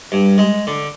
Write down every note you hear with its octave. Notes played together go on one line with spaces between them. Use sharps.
G2
G#3
D3